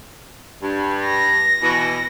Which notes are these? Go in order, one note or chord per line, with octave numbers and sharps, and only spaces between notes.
G2
A#6
B2 E3